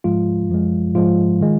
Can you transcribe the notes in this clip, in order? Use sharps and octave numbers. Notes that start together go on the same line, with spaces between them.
G#2 F3 G#3 F4
F#2 F3 G#3
G#2 F3 G#3 F4
D#3 G#3